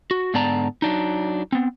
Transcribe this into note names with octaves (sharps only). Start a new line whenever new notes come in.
F#4
G#2 D3 B3 D5 A5 A#5
F#3 D4 D#4
B3 C4